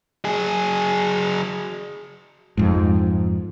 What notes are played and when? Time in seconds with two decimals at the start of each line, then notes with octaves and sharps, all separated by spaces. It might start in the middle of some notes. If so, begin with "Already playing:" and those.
0.25 F#3 G#4
2.57 F2 G#2